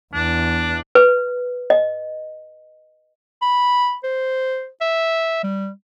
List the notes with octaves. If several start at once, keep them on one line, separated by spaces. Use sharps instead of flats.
E2 D4
B4
D#5
B5
C5
E5
G3